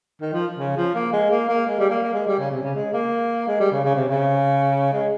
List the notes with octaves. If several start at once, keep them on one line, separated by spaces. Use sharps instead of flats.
D#3
F3
C#3
F3
A#3
G#3
A#3
A#3
G#3
G3
A#3
A#3
G#3
G3
C#3
C3
C#3
G#3
A#3
G#3
G3
C#3
C#3
C3
C#3
G#3